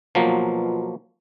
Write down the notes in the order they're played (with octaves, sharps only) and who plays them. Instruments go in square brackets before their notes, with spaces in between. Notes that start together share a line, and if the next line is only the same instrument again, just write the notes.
[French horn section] B2 F4 [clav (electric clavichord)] F3 F#3 A#3